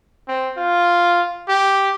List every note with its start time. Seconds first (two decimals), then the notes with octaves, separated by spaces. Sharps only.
0.28 C4
0.57 F4
1.48 G4